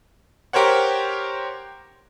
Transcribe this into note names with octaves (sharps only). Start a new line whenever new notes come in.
G4 A#4 C5 C#5 F#5